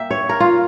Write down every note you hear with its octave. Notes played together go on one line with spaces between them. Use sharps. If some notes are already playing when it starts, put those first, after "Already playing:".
Already playing: A#3 E5 G5
C#5
A#4
F4